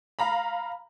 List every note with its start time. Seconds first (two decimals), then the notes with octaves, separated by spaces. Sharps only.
0.19 F5 A#5 B5